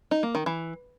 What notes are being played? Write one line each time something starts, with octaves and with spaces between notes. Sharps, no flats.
D#4
A#3
D#3
E3